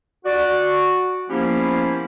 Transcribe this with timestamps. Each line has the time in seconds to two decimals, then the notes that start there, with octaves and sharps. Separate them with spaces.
0.25 F#4 D5
1.29 F3 A#3 B3 C#4 E4 G4